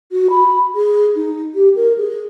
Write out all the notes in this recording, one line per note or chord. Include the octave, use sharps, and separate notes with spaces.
F#4
B5
G#4
D#4
G4
A#4
G#4